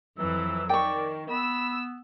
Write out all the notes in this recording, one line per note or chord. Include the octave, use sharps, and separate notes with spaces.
F2 E3 F#3 E6
D#3 D5 G5 C#6
B3 B5 E6